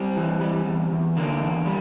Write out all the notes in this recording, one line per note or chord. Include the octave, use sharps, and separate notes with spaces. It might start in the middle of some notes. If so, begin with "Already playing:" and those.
Already playing: G3 C4
E3
G3
E2
E2
D3 A#3
E2
G3